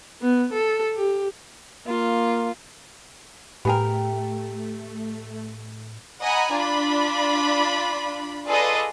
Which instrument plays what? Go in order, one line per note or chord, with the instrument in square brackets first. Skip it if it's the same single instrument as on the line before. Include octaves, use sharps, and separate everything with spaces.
[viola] B3
A4
G4
[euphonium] A#3 [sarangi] F4
[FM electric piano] A2 [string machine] A3 [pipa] B3 G#4 A#4 [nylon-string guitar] G4 G5
[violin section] D#5 F#5 G#5 A#5 B5
D4 F4 B5
F4 G#4 A4 B4 D5 D#5